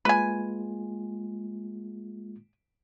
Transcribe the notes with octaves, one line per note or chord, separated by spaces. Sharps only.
G#3 A#3 F4 B4 G#5